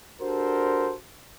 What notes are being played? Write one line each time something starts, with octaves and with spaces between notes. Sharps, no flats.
D4 F#4 G4 A4 A#4 C5